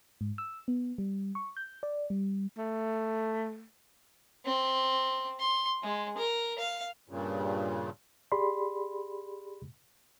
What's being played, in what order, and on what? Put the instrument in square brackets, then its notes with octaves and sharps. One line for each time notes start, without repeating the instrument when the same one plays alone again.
[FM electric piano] G#2
E6
B3
G3
C#6
G6
D5
G3
[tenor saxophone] A3
[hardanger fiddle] C4
C6
G#3
A#4
F5
[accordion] G2 A#2 C#3
[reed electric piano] G4 G#4 D5 B5 C6